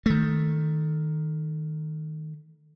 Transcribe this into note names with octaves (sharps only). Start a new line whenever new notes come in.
D#3 A3